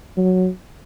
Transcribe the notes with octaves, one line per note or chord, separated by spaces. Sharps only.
F#3